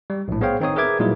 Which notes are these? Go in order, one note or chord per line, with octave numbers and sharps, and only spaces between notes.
G3
A#1 A2
B3 G#4 C5 C#5 F5 G5
D#3 C4 D#4 C#5 D#6
G#4 A#4 B4 E5 D6 G#6
A#2 F#3 G3 D#4 E4 G#4